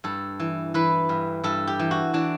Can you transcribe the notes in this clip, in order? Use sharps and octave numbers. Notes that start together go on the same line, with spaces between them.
G2 A4
E3
E3 B4
G2
G2 A4
G4
E3
F#4
E3 D4